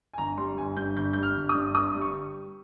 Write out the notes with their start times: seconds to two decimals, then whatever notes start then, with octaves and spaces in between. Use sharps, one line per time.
0.13 G#5
0.18 G1 A#5
0.38 G3 C6
0.58 G1 G#5
0.77 G2 G6
0.97 G1 G6
1.13 G3 G6
1.23 F6
1.36 G1
1.49 D#6
1.55 G2
1.75 G1 D#6
1.95 G3
2.01 C#6